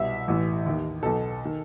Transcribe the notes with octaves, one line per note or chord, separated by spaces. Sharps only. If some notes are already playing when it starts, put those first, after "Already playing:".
Already playing: C2 B2 E5
A1 A2 E3
D#2 D#3
B1 B2 A4
D#3